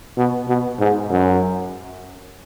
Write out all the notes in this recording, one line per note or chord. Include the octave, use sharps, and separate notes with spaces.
B2
B2
G#2
F#2